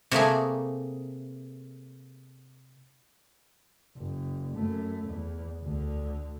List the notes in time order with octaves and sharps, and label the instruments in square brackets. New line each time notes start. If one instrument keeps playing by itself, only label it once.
[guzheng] C3 A3 A#3 G#4
[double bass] F#1
F#2 A3
E2
D2 D3